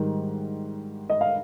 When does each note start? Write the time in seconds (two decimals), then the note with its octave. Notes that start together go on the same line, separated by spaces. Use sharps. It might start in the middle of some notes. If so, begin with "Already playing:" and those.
Already playing: G#2 D#3 G3
1.10 D#5
1.21 F5